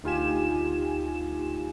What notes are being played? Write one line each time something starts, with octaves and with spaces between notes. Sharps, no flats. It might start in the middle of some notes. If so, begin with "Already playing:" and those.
D2 D#4 F4 G4 G#5 E7